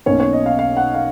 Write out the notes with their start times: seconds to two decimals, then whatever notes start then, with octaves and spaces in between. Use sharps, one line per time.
0.06 B1 B2 A#3 C#4 C#5
0.20 C#5
0.33 D#5
0.46 F5
0.59 F5
0.77 F#5
0.94 F5